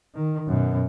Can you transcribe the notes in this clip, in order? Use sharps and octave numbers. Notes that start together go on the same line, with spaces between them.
D#3
F#2 B2